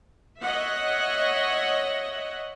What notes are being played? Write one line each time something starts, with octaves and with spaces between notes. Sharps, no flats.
C#5 D#5 E5 F#5